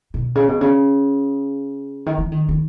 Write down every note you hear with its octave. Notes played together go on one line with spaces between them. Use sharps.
B2
C#3
B2
C#3
D#3
E3
D#3
D#3